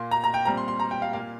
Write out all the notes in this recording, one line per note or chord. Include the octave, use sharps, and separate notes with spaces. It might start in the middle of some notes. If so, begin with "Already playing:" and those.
Already playing: A#2 A#3 C6
A#5
A#5
G5
A#2 G3 C4 A#5
C6
C6
A#5
G5
F5
A#2 A#3 F5